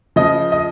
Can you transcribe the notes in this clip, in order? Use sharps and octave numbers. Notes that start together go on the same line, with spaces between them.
C#3 F3 D#5
D#5